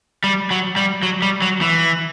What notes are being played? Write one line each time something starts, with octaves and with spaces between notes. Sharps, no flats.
G3
F#3
G3
F#3
G3
F#3
E3